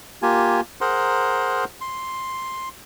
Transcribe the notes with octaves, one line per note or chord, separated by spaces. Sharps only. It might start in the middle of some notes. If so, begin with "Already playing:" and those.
A#3 F4 G4 G#5
G#4 A#4 C5 F#5 A#5 C6
C6